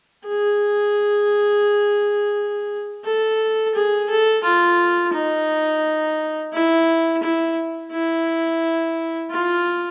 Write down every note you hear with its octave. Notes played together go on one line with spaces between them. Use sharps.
G#4
A4
G#4
A4
F4
D#4
E4
E4
E4
F4